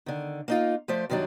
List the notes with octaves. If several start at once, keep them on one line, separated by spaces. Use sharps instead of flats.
D3 D#3
A#3 D#4 F4
F3 A3 C5 D5
F#2 D#3 F#3 G3 D4